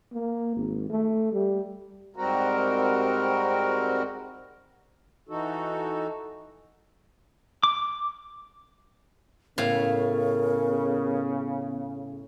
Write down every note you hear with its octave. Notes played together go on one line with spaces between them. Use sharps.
A#3
G#1
A3
G3
G#2 G3 C4 F#4 A#4
E3 D#4 F#4 A4
D6
A2 C#3 B3 A#4 F5